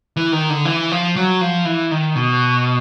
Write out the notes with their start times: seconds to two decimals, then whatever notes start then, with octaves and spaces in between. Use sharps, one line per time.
0.17 E3
0.32 D#3
0.50 D3
0.65 E3
0.91 F3
1.16 F#3
1.41 F3
1.65 E3
1.91 D#3
2.15 B2